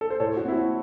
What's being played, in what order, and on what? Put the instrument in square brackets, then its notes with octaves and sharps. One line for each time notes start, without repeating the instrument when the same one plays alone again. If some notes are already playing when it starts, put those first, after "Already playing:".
[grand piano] A4
C5
A2 A4 C#5
F#4
C4 E4
F#4